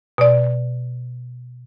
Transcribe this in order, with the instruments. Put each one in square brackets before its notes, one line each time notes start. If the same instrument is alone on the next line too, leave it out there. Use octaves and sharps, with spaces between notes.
[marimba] B2 D5